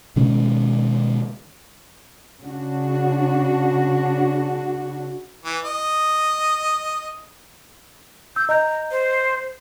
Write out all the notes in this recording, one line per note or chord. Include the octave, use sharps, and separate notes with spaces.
B2 D#3 G#3 C#4
C#3 D4 F#4
E3
D#5
E6 G6
D#5 A#5 G6
C5